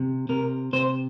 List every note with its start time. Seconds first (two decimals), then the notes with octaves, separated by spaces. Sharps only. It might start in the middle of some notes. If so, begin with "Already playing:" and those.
Already playing: C3
0.29 C3 A#4
0.73 C3 C5